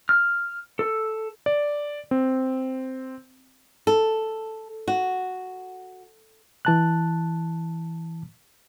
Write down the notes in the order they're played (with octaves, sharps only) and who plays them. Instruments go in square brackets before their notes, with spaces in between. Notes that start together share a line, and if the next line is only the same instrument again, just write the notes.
[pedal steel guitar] F6
A4
[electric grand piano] D5
C4
[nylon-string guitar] A4
F#4
[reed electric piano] E3 A5 F#6